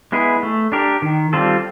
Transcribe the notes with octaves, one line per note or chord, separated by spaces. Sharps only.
G#3 B3 E4 G#4
A3
D4 G4 A#4
D#3
G3 C4 F4 A4